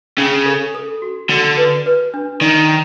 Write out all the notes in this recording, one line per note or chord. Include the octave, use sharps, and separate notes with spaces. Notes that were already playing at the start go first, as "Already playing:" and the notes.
C#3 C#4
A4
A4
F#4
D3 F#4
B4
B4
D4
D#3 D5